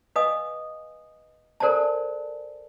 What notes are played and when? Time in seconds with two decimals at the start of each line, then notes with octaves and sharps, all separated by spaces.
0.16 B4 D#5 F5 G#5 D#6
1.60 A4 A#4 C5 D5 G#5 A5